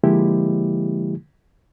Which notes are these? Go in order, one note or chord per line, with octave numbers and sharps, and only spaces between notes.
D3 F3 G#3 A#3 E4 G4